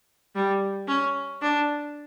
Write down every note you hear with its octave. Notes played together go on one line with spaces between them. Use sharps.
G3
C#4
D4